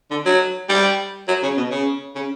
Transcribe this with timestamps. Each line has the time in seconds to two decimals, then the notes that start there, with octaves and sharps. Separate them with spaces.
0.11 D3
0.26 F#3
0.69 G3
1.28 F#3
1.43 C#3
1.57 B2
1.71 C#3
2.15 C#3